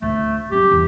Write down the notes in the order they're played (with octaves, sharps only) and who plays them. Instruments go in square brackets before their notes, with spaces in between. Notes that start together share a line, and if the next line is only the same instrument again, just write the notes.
[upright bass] D2 [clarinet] A3
[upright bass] F#3 C#4 [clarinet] G4
[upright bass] E2